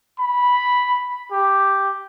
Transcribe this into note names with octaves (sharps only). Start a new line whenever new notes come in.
B5
G4